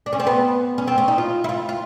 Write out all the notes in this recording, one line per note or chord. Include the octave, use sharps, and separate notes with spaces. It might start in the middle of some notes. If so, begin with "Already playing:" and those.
D4
C#4
C4
B3
C#4
C4
C#4
D#4
F4
E4
F4
F4